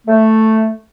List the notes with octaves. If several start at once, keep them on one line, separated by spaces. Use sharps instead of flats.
A3